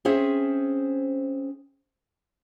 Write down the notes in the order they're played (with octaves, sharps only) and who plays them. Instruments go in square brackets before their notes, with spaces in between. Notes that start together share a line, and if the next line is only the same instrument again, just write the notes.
[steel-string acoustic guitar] C4 C#4 G#4 C5 E5